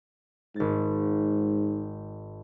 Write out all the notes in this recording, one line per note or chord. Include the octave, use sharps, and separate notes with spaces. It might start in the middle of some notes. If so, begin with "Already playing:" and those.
G#1 G#2 A6